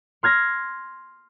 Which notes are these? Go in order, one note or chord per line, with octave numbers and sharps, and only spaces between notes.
C6 F6 G#6 A#6